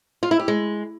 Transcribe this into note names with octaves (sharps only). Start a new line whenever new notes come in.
F4
E4
G4
G#3